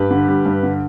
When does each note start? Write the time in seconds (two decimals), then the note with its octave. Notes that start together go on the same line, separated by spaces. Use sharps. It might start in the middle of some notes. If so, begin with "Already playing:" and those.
Already playing: G2 G4 B4
0.11 D3
0.28 G3
0.45 G2
0.63 D3